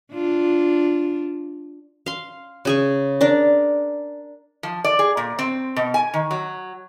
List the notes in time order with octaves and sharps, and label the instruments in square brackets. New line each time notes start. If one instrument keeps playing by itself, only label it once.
[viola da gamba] D4 F4
[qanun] F5 C6
C#3 G#4 C#6
D4 A#4 D5
[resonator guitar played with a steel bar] F3
D5
G#4
A#2
C4
B2
G#5
D#3
F#3